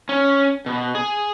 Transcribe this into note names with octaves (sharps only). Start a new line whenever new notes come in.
C#4
B2
G#4